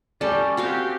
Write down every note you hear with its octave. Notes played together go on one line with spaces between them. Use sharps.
G3 C#4 A4 D5
C4 F#4 G4 C#5 F5